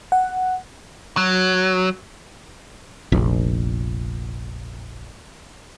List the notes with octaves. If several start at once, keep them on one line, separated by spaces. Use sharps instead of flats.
F#5
F#3
F1 A#1